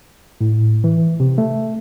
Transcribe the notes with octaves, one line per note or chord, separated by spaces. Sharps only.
A2
E3
C3
A3